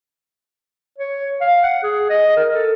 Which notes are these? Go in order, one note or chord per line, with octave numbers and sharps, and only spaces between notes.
C#5
F5
F#5
G#4
D#5
A#4
A4